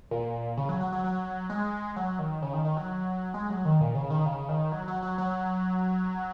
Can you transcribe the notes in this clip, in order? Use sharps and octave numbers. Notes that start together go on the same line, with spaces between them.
A#2
C#3
F#3
F#3
F#3
F#3
G#3
F#3
D#3
C#3
D#3
D#3
F#3
G#3
F#3
D#3
A#2
C#3
D#3
C#3
D#3
F#3
F#3
F#3
F#3